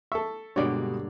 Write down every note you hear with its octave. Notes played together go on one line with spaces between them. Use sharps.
A4 E5 C#6
G2 B2 D3 G#3 A#3 G4 C#5 D5